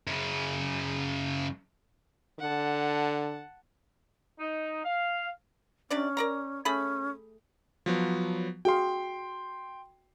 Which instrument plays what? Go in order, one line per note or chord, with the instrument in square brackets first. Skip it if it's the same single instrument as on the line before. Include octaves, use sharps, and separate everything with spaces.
[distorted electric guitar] F#2 C#3
[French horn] D3 [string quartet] F#5 A5
[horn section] D#4
F5
[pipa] C3 D4 D5 [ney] C#4
[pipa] A#4 D5 A#5
[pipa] A3 G#4 B5 [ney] C#4
[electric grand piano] F3 F#3 B3
[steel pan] F#4 G#4 F5 [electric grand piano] G5 C6